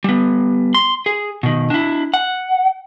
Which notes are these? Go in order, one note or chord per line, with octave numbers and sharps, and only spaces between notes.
G3 B3
C6
G#4
B2 D#3
D4 E4
F#5